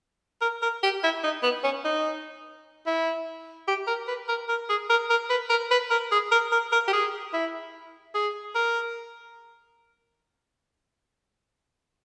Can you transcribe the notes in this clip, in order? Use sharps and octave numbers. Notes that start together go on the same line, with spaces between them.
A#4
A#4
G4
E4
D#4
B3
C#4
D#4
E4
G4
A#4
B4
A#4
A#4
G#4
A#4
A#4
B4
A#4
B4
A#4
G#4
A#4
A#4
A#4
G4
G#4
E4
G#4
A#4